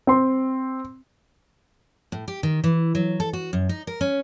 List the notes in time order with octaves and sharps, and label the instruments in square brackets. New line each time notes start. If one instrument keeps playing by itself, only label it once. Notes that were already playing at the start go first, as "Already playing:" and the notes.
[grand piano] C4 C6
[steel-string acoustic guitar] A2
G4
D#3
E3
F#3
A4
F#4
F#2
D#4
A#4
C#4